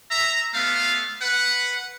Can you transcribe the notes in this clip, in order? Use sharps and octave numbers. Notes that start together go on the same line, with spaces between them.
E5 A#5
A3 B3 F5
B4 F#5